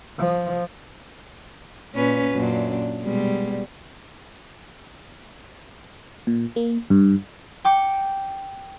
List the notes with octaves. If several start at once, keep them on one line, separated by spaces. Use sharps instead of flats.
F3
A#2 C#4 B4
F#2 A#2 D4
B2 G3 G#3
A#2
A#3
G2
G5 D6 C#7